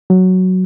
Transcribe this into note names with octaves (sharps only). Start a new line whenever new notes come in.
F#3